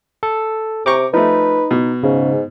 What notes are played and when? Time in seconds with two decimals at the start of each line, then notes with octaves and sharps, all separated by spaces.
0.23 A4
0.86 C3 G5 A#5 C#6 D6
1.14 F3 A3 D#4 B4
1.71 B2
2.03 G#2 C#3